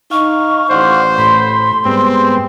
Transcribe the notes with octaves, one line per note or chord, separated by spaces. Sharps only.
D#4 F5 C#6
A1 C5 D5 F5 F#5
A2 B5 C6
G#2 G3 B3 C4